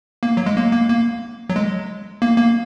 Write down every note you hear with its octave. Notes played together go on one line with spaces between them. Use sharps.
A#3
F#3
G#3
A#3
A#3
A#3
F#3
G#3
A#3
A#3